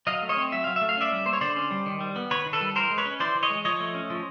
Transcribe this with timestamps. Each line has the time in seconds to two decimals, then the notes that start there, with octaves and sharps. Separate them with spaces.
0.07 F#3 D#5 F5
0.22 A3
0.29 C#5 D#5
0.37 C4
0.52 F#3 E5
0.64 F#3 F5
0.76 E5
0.81 A3
0.89 F5
0.97 C#4 D5 E5
1.12 G3
1.26 A#3 C5
1.33 C#5
1.41 D3 C5 D5
1.56 C#4
1.71 G3
1.86 D#3
2.00 G3
2.16 B3
2.31 D#3 B4 C#5
2.46 D#3
2.53 A4 B4
2.61 G3
2.76 E3 A#4 C5
2.90 G#3
2.98 B4 C#5
3.05 C#4
3.20 E3 C5 D5
3.35 E3
3.43 C#5 D#5
3.50 G#3
3.65 F3 C#5 D#5
3.80 A3
3.94 C#4
4.10 F3